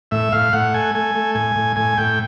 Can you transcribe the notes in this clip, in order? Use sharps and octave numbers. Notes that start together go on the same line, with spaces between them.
A2 E5
A2 F5
A2 F#5
A3 G#5
A3 G#5
A3
A2 G#5
A2
A2 G#5
A2 G5